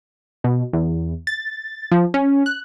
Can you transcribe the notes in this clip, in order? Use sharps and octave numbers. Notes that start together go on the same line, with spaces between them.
B2
E2
A6
F3
C#4
F#6